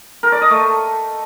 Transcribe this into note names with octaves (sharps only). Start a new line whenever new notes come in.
A#4
D5
D#5
A3